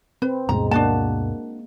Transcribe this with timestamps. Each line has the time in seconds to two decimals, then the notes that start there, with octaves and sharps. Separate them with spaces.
0.22 C4 B4
0.49 D2 G2 B2 G#3 A#5
0.71 A#3 D4 F#4 A5